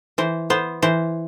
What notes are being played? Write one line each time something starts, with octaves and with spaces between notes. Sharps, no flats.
E3 C5
B3 C5
E3 C5